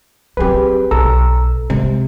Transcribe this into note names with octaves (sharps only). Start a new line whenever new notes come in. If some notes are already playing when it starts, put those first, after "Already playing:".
F#3 C4 G4 G#4 B4
B1 A4 A#5 E6
C3 G#3